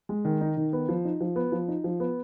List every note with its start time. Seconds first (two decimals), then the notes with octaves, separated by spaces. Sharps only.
0.09 G#3
0.25 D#3
0.41 D#4
0.57 D#3
0.73 B3
0.89 F3
1.05 D#4
1.21 F3
1.36 B3
1.52 F3
1.68 D#4
1.84 F3
2.00 B3